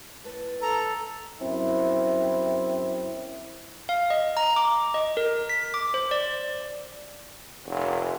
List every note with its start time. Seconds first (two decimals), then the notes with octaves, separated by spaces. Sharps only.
0.24 A2 B4 A5
0.61 A4 A#5
1.42 F#2 C4 E4
3.89 F5
4.10 D#5
4.37 A#5
4.56 D6
4.94 D#5
5.17 A#4
5.49 B6
5.74 D6
5.94 C5
6.11 D5
7.67 F1